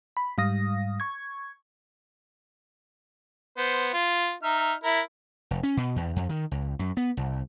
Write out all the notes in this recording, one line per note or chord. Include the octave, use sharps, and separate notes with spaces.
B5
G#2 G3 F5 D#6 A#6
C#6 G#6
B3 C5
F4
D#4 E5 F6
E4 A#4
F1
C#4
B2
E2
F2
D#3
C#2
F#2
B3
C2